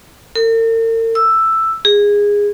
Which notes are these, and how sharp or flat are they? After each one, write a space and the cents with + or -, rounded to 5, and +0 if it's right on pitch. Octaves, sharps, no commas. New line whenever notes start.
A#4 -45
E6 +5
G#4 -15